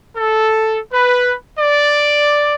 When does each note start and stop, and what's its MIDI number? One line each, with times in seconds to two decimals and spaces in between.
0.15 0.78 69
0.92 1.33 71
1.58 2.55 74